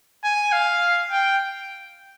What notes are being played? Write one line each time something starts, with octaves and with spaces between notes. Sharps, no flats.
G#5
F5
G5